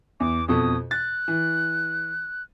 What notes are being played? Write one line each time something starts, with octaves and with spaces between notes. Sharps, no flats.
E2 D6
F2 B2 A4 D#6
F#6 A6
E3